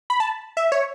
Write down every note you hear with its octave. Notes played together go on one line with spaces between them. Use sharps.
B5
A5
E5
C#5